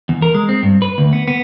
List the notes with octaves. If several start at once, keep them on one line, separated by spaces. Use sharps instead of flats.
E2
A#4
G#3
C4
G2
B4
D2
B3
B3